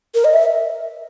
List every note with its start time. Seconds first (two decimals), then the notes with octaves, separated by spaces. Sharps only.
0.15 A#4
0.24 D#5
0.34 E5